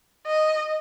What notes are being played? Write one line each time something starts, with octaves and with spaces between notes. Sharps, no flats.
D#5